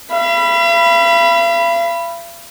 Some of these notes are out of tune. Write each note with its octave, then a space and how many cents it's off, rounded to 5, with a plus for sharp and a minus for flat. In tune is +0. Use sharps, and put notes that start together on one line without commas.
F5 -45 B5 +0